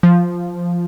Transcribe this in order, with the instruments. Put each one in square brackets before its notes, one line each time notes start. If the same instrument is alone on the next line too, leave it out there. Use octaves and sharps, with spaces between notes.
[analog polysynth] F3